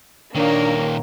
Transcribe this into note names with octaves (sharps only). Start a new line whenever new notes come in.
A#2 D#3 A#3 D4 A#4 C#5